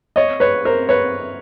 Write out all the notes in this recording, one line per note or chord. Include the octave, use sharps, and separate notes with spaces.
C#5 D#5
B4 C#5
A#4 C5
B4 C#5